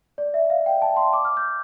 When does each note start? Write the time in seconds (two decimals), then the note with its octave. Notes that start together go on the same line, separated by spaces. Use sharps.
0.18 D5
0.34 E5
0.50 F5
0.66 G5
0.82 A5
0.97 C6
1.13 D6
1.25 F6
1.37 G6